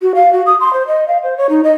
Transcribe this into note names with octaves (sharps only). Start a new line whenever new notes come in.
F#4
F5
F#4
D#6
C6
C5
D#5
F5
C5
C#5
D#4
D#5